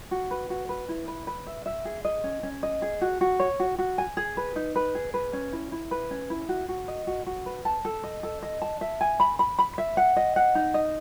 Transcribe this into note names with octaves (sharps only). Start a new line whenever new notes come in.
F#4
B4
F#4
B4
E4
B4
B4
E5
E5
G#4
D#5
C#4
C#4
D#5
G#4
F#4
F#4
C#5
F#4
F#4
G#5
G#4
B4
D#4
B4
G#4
B4
C#4
E4
E4
B4
C#4
E4
F#4
F#4
D#5
F#4
F#4
B4
A5
A4
D#5
A4
D#5
A5
E5
G#5
B5
B5
B5
E5
F#5
D#5
F#5
D#4
D#5